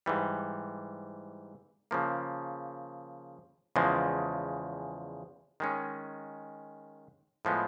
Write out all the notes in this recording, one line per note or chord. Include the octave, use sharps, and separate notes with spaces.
G#2 E3 G3
C#3 F3 A#3
E2 C#3 F3 G#3
D#3 G#3 C#4
A2 F3 G#3 B3